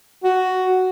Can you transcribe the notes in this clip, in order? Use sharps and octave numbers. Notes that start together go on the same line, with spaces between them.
F#4